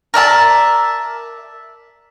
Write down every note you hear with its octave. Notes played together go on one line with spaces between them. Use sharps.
A#4 D5 E5 A5